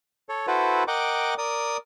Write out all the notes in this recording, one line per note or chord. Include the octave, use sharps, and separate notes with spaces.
A4 C#5
E4 F#4 A4 B4 C5
A#4 D#5 F#5 G5 D6
A#4 D5 D#6